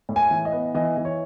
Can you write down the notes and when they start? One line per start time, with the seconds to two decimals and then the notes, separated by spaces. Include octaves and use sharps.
0.09 A2
0.16 G#5
0.31 E3
0.45 D#5
0.52 B3
0.74 E3 D#5
0.97 E3
1.05 C#5